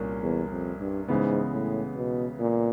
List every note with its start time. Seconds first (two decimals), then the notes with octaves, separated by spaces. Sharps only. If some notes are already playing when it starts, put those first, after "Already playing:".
Already playing: C2 A#2 A#3 C#4
0.22 E2
0.51 F2
0.80 G2
1.08 G#2 C#3 E3 G#3 B3
1.53 A2
1.96 B2
2.40 A#2